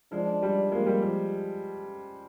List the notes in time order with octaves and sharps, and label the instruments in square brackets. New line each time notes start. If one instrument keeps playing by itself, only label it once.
[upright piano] F3 G#3 [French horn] D4
[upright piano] G3
[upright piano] F3 G#3 [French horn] A#3
[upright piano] G3
F3